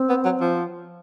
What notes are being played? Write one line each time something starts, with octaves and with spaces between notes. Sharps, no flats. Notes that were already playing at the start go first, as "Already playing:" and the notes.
Already playing: C4
B3
F#3
F3